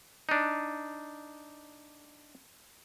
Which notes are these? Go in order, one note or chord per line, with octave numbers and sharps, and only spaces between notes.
D4 D#4